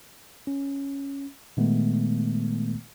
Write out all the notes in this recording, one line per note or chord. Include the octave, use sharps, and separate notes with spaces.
C#4
A#2 D#3 G#3 A3 B3